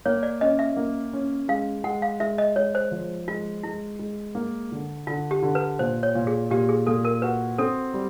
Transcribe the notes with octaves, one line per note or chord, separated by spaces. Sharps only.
A#3 C#5
D5
C#4 D#5
E5
A#3
C#4
G#3 F5
G#3 F#5
F5
G#3 E5
D#5
G#3 C#5
C5
F3
G#3 F4
G#3 E4
G#3
A#3
D3
D3 F4
G4
D3
B4
A#2 C5
C#5
A#2
G#4
A#2 G4
G#4
A#2 A4
A#4
F#4 B4
C4 A4
G3